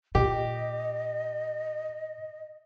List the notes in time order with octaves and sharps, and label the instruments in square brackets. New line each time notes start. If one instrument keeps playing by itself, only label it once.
[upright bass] A#2 [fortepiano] G4 [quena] D#5